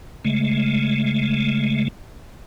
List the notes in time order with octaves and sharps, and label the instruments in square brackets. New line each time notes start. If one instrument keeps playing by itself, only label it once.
[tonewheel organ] C#3 G#3 A3